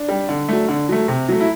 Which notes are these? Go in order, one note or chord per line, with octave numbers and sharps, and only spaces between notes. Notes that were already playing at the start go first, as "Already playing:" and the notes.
Already playing: D4
G3
D3
F#3 A3
D3
F#3 A3
C3
F#3 A3
E4